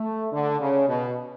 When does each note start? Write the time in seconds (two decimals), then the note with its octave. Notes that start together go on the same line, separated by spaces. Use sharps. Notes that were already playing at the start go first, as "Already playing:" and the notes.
Already playing: A3
0.33 D3
0.60 C#3
0.89 B2